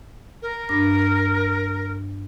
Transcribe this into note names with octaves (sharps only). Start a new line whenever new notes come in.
A#4
G2 D4 A#6